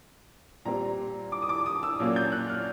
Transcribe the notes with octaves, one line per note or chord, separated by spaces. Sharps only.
A#2 G3 C4 A#5
D6
D#6
D6
D#6
E6
A#2 F#3 A#3 C#4
G6
F#6
F6